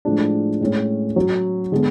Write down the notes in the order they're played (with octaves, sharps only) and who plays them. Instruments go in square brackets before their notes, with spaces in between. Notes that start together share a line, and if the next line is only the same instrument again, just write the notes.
[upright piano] A2 F3 G#3 D4
A2 G#3 C#4
F#3 C#4 F#4
D3 G#3 B3